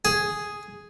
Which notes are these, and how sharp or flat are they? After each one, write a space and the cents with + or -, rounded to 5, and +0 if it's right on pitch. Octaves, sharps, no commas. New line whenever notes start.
G#4 +0